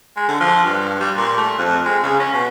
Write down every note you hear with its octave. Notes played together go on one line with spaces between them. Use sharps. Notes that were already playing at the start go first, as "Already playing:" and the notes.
G#3
D3
F3
G2
G3
A#2
A3
F2
G#3
C#3
C#4
B2